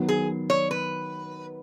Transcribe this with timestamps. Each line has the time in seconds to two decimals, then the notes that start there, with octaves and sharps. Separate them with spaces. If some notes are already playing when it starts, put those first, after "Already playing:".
Already playing: D#3 F#3 B3
0.09 G#4
0.50 C#5
0.71 B4